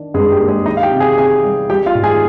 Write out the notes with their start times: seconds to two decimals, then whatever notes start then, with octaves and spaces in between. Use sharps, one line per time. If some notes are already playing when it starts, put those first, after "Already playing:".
Already playing: D#3 D4
0.14 G2 G#3 G#4
0.32 G4
0.40 A#3
0.48 G#3 G#4
0.66 D#3 D#4 D#5
0.77 F5
0.83 G4 G5
0.91 C3
1.00 G#4 G#5
1.18 C3 G#4 G#5
1.44 G3
1.70 G3 G4 G5
1.86 F4 F5
1.95 G#2
2.04 G#4 G#5